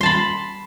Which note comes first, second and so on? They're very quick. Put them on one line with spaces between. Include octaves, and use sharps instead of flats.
C6 A5 B5